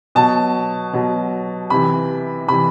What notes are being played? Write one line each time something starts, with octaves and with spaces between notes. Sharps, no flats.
B2 F#3 A5
B2 F#3
C3 E3 B5
C3 E3 B5